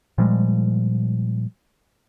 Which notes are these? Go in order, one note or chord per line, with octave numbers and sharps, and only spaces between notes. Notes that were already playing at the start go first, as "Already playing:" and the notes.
A#2 F3 G3 G#3